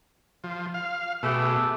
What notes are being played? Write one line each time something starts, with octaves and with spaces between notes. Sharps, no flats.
F3
F5
B2 A3 G4 G#4